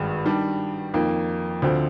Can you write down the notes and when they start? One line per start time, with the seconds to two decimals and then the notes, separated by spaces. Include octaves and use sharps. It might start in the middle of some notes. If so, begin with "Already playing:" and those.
Already playing: G#1 G2 G#3
0.25 D#3 G3 D4
0.94 F2 D#3 A#3
1.62 D2 D3 F3 C4